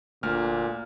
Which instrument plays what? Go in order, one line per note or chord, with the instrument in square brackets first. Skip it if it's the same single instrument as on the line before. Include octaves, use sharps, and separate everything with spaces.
[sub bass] F1 [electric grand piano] D2 F6 [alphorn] A#2